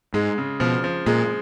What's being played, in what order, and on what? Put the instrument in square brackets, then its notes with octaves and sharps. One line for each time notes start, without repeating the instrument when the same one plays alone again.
[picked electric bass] G#2 [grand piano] G#3
[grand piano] C#3
[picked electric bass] B2 [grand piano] F3
[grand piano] F3
[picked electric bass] A#2 [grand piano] G#3